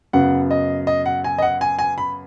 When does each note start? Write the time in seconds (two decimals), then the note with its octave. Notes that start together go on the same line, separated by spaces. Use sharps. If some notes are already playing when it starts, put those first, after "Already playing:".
0.13 F#2 C#3 B3 F#5
0.51 D#5
0.87 D#5
1.06 F#5
1.24 G#5
1.38 D#5
1.42 F#5
1.61 G#5
1.79 G#5
1.98 B5